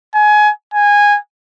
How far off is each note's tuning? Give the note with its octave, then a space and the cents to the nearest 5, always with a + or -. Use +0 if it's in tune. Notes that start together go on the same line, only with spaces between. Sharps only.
G#5 +20
G#5 -15